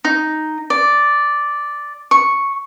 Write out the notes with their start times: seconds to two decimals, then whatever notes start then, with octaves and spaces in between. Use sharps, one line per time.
0.05 D#4
0.70 D5
2.11 C#6